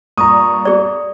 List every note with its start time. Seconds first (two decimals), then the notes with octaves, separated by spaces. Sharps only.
0.17 G2 A#2 A#5 C#6 D#6
0.65 G#4 D5